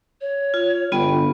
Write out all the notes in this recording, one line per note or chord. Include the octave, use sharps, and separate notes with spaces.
C#5
F4
G1 B3 F4 G5